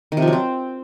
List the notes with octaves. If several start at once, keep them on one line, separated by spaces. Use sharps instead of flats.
D#3
C3
F3
F#3
C4